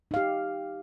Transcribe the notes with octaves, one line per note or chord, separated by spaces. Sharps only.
D#4 G4 F5